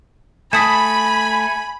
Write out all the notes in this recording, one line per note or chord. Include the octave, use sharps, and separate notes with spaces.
A3 G#5 A5 B5 D#6 B6